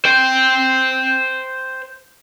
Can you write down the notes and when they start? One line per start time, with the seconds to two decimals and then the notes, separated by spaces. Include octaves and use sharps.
0.05 C5 G5